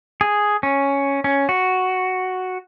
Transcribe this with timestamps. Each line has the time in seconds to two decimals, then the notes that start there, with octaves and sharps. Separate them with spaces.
0.21 G#4
0.63 C#4
1.24 C#4
1.49 F#4